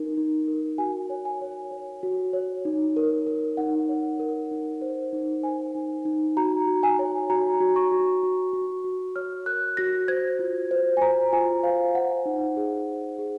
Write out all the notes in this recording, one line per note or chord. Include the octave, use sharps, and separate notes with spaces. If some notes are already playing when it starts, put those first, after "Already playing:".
Already playing: D#4 A#4
D#4
A#4
F#4 G#5
C#5
G#5
C#5
C#5
F#4
C#5
D#4
A#4
A#4
D#4 F#5
C#5
A#4
D#4
C5
D#4
C5 G#5
D#4
D#4
F#4 A#5
F#4
G#5
C#5
F#4 A#5
F#4
C#6
F#4
F#4
F#4
F#4
C#5 F6
A#4 F#6
F#4 A#6
C5 G#6
F4
C5
G#5
C5 A#5
F4 G#5
C5 F5
C5 F#5
D#4
G#4
C5
G#4